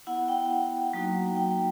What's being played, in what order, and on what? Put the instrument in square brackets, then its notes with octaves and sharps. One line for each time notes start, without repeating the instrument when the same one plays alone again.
[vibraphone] B3 E4 F#5
G5
F#3 A#3 D#4 F#4
G5